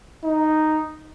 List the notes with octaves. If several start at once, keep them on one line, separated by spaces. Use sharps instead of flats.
D#4